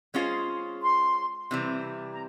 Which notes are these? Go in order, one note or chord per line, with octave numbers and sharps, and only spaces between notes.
G#3 C#4 F4 G#4 C5
C6
C3 E3 G3 C4
A#5